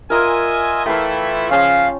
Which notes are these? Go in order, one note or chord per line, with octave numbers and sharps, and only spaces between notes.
F4 A#4 D#5 E5 G#5
E3 A3 E4 G5 A5 C6
C#3 F3 C#4 F5